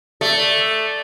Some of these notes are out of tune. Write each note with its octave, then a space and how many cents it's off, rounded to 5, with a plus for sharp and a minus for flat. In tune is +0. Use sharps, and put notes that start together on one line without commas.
A3 +0 D5 +0